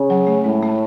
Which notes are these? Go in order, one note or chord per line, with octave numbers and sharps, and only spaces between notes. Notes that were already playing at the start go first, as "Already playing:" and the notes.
Already playing: C#3
F#3
A3
A2 G#3
A3